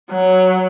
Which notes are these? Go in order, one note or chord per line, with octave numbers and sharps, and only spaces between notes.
F#3